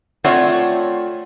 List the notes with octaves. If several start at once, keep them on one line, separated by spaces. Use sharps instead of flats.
A3 C4 F4 C#5 D5 F#5